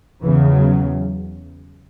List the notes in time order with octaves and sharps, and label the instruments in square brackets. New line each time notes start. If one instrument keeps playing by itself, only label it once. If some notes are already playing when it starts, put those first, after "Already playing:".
[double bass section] E2 C#3 E3
F#3